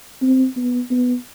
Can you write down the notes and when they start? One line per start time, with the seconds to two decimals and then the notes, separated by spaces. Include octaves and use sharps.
0.22 C4
0.57 B3
0.91 B3